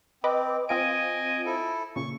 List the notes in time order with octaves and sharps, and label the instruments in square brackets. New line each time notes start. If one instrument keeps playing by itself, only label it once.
[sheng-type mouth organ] C4 [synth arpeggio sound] B4 D#5 D6
[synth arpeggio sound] C4 F4 D7 [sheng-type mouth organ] D#5 G#5
[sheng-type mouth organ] E4 A4
[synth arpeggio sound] A#2 C#3 [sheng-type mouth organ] C#6